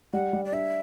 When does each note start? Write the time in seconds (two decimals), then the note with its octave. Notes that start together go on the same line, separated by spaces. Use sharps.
0.13 G3 F#5
0.33 G3
0.45 D5
0.52 D4 E5